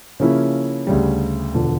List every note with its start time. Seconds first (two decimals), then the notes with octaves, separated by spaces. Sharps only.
0.20 C#3 F3 A#3 C#4 E4
0.87 D2 C#3 G3
1.54 E1 D3 F3